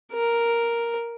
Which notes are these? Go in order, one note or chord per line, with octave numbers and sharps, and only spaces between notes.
A#4